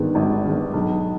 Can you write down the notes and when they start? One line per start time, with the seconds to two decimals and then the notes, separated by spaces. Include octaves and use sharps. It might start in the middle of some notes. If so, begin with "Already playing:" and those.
Already playing: G#1 G2 D#3 G#3 B3
0.15 G#1
0.44 G2 D#3 G#3 B3
0.73 B1